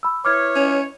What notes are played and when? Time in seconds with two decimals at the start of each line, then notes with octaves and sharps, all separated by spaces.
0.03 B5 E6
0.25 E4 B4 C#5 D6 F6 G#6
0.56 C#4